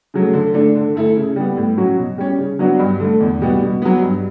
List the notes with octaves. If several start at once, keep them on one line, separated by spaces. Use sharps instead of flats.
C#3 F#3 A3
D3
A3 D4 A4
D3
A3 E4 A4
C#3
G3 B3
A2
F#3 C#4 F#4
B2
G3 C#4
C#3
F#3 B3 D4 F#4
G2
D3 A3
E2
B2 G3 B3
B2
F#3 B3
G2